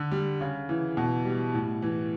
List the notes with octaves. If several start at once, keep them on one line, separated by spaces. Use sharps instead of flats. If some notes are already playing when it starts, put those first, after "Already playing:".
Already playing: D3
G3
C#3
E3
B2
G3
A2
E3